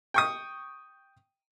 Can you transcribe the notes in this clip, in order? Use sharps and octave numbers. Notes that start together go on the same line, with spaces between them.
G5 C#6 D#6